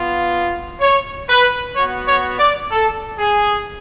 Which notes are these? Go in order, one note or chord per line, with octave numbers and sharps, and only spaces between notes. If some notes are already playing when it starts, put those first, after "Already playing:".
Already playing: B3 F4
C#5
B4
B3 F#4 C#5
C#5
D5
A4
G#4